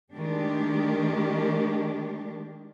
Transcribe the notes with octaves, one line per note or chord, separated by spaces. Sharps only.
D#3 G#3 A3 D4 G4